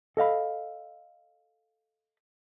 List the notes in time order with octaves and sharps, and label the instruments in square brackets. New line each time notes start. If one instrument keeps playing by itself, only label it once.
[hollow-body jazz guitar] A4 D#5 F5 B5